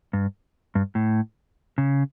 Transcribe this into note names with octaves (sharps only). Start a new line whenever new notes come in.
G2
G2
A2
C#3